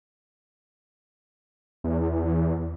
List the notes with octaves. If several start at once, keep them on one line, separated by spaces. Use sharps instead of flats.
E2